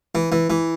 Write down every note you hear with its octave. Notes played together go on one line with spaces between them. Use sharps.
E3
E3
E3